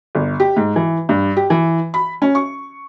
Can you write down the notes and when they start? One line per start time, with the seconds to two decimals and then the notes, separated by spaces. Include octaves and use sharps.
0.15 G1
0.40 G4
0.57 G#2
0.76 E3
1.09 G2
1.37 G4
1.50 E3
1.94 B5
2.22 C#4
2.35 C#6